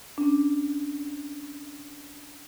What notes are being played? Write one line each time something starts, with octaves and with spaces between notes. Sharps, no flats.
C#4 D4